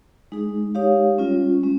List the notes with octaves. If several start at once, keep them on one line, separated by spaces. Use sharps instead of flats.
G#3 D#4 G#4
G#3 D#4 G4 C#5 F5
G3 C#4 F4
G#3 C#4